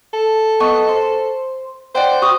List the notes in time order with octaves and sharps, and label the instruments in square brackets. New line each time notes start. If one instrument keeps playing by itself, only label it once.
[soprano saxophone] A4
[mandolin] B3 D#5 C#6
C5
[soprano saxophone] C5 [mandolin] D5 F#5 G5
[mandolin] F#4 D#6